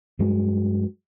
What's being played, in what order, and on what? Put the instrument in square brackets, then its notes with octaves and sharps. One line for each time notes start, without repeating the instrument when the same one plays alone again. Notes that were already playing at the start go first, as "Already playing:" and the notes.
[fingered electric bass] G2 F#3 G#3